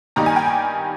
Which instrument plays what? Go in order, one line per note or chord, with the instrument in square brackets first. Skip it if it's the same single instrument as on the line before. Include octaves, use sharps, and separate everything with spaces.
[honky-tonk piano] G2 D#3 G3 A#3 D#4 A#5
G#5
G5
G#5